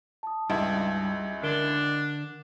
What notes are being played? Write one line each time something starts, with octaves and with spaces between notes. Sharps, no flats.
A5 D#6
C#2 G2 D#4 E4
D3 D4 A#4 D7 G7